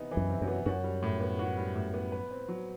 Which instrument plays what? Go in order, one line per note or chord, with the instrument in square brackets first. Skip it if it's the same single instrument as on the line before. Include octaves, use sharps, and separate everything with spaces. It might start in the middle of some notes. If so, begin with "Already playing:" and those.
Already playing: [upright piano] C3 E3 B3 D#4
E3
[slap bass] F#2
[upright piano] C3
[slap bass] F#2
[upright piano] B3
[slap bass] F#2 [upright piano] F#4
[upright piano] G3
A2
B3
F#4
G3
A2
B3
B4
C4
F#3